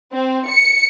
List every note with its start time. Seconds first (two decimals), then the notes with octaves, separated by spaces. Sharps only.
0.13 C4
0.48 C#7